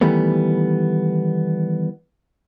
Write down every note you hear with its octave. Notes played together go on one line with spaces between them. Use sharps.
D#3 E3 G3 A3 B3